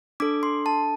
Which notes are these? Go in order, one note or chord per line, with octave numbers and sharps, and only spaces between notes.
D4 A4 D6
C6
A5